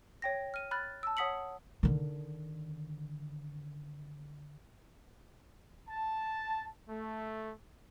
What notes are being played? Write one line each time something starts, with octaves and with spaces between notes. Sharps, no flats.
C#5 G5 A#6
F6 D#7
B5 F6 F#6 A6
A5 E6
C#5 F#5 D#6 B6 C#7 F#7
D3 D#3
A5
A3